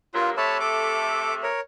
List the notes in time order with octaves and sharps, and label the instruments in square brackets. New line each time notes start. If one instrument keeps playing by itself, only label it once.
[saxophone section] G2 F#3 A#3 [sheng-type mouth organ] F4
[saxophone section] C3 A3 [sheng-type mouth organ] C#5 A5 B5
[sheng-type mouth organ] A4 D6
A#4 C#5